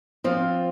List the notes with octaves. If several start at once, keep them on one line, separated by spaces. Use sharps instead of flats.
F3 C4 F4